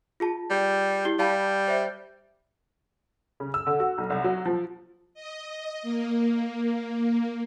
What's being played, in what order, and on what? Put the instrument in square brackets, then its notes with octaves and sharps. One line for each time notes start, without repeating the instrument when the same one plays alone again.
[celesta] F4 G#4 A5
[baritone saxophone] G3
[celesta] E4 G4 G7
[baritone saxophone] G3 [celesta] F5 A5 B5
[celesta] C5 E5
[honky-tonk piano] C#3
E6
D3
F#4
B1
C2
F#3
F3
[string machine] D#5
A#3